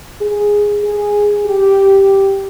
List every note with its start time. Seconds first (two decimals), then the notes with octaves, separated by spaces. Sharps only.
0.21 G#4
0.84 G#4
1.46 G4